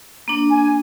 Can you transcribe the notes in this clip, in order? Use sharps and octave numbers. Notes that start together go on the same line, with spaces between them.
A#3 D4
G#5